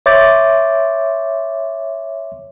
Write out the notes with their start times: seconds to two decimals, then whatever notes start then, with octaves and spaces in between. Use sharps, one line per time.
0.06 C#5 E5 C6 D6 G6 A6